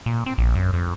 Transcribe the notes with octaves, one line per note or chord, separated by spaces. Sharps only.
A#2
C4
A#1
F#2
F2